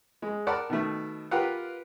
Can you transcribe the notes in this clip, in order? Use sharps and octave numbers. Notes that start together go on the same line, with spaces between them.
G#3
A#4 D5 F#5 A5 B5
B2 D#3 A3
F4 G4 A#4 B4 F5 F#5